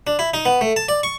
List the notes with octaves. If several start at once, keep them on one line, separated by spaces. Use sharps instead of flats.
D4
E4
D#4
B3
A3
A5
D5
C#6